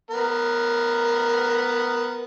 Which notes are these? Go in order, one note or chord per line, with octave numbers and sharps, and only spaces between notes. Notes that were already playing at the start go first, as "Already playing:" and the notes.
B3 A#4